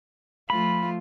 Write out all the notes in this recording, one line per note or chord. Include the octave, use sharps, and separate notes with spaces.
F3 A3 F4 B5